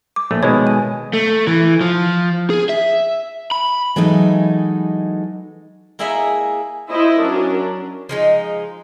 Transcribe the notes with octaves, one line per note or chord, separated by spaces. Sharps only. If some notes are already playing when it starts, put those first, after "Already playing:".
D6
A#1 A3
B2 D#3 G#3 C#5
G#5
A3
E3
F3
G#4
E5
B5
E3 F#3 G#3 A3 D#4
A#3 E4 G#4 D#5 E5 F#5
E4 C5 D#5 E5
F#3 C#4 D4 A#4
F3 G#3 D#4